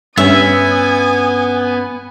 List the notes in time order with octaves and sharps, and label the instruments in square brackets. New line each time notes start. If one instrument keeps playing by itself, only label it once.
[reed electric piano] G2 C#4 [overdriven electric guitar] B3 [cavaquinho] E5 [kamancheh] G#5 D#6